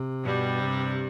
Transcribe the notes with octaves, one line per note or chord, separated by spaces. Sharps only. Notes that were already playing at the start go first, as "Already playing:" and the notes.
Already playing: C3
G2 B2 G3
C3